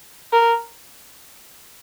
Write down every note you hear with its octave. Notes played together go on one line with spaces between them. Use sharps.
A#4